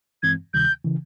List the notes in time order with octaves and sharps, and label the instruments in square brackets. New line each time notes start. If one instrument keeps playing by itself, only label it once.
[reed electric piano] G2 E3 G#3 C4 [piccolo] G#6
[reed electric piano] D2 C3 D#3 G3 [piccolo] G6
[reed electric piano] C#3 E3